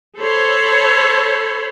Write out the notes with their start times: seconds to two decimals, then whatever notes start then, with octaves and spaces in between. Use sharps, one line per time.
0.18 A4 C5 C#5 B5